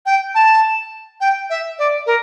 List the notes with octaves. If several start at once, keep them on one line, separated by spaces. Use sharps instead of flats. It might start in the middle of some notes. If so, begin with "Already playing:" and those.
G5
A5
G5
E5
D5
A#4